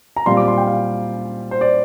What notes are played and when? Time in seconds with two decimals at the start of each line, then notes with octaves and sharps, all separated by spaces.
0.16 A#5
0.26 A#2 G3 C4 F4 C6
0.37 D6
0.48 C6
0.58 G5
0.67 F5
1.51 C5
1.61 D5